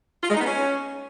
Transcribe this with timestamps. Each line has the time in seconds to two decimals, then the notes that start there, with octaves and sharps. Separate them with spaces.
0.23 F4
0.29 G#3
0.35 D#4
0.40 B3
0.46 C#4